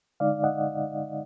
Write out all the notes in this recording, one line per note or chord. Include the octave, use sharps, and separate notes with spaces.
D3 G#3 D#4 D5 F5
D#5 F#5